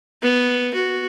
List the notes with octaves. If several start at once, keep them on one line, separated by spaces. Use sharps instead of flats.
B3
F#4